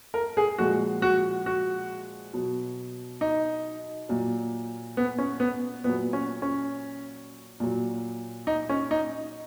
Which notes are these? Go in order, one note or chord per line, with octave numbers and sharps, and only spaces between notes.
A#4
G#4
A#2 F3 G#3 F#4
F#4
F#4
B2 F#3
D#4
A#2 F#3
B3
C#4
B3
A#2 F#3 B3
C#4
C#4
A#2 F#3
D#4
C#4
D#4